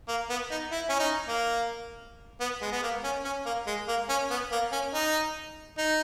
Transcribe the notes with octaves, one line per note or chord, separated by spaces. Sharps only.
A#3
B3
D#4
E4
C#4
D#4
A#3
B3
G#3
B3
A#3
C#4
C#4
A#3
G#3
A#3
C#4
B3
A#3
C#4
D#4
D#4